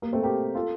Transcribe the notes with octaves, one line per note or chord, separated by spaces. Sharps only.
A#3
A3 C4
G4 A#4
F4 A4